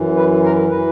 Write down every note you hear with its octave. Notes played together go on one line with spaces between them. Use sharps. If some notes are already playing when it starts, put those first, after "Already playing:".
Already playing: F#2 E3
B4
A#4
E3 B4